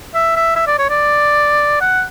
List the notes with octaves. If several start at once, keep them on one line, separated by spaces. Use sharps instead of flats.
E5
E5
E5
D5
C#5
D5
F#5